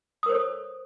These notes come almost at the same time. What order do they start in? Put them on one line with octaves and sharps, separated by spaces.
D#6 A#4 C5 C#5 A4